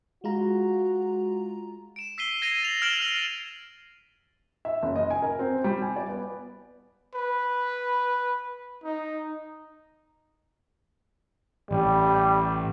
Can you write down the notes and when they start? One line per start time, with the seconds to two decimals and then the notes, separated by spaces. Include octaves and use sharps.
0.24 G#3 F4 F#4 A#5
1.96 D7 E7
2.18 E6 B6 C7 D#7 G7
2.42 G#6 A#6 C7 D#7 F7
2.62 A6 F7 F#7
2.82 F6 G#6 D7 E7 F#7 G7
3.01 F6 A#6 C7 F#7 G7
4.65 E5
4.82 F#1
4.96 D#5
5.11 G#5
5.22 A#4
5.39 C4
5.64 G3
5.82 G#5
5.96 D5
6.09 B3
7.14 B4
8.83 D#4
11.71 A1 G3